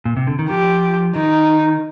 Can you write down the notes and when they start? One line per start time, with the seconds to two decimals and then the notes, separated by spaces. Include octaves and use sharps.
0.05 A#2
0.17 C3
0.27 D3
0.39 D#3
0.50 F3 G4
1.15 D#3 D#4